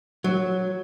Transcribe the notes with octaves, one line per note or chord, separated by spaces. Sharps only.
F#3